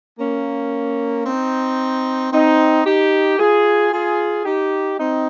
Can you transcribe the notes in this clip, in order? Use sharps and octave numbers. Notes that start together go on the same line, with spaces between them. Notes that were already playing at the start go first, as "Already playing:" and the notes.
A#3 C#4
C4 D#4
C4 D#4
D#4 G4
F4 G#4
F4 G#4
D#4 G4
C4 D#4